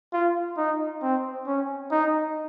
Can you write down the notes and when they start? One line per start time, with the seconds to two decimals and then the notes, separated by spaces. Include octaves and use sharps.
0.13 F4
0.58 D#4
1.02 C4
1.47 C#4
1.91 D#4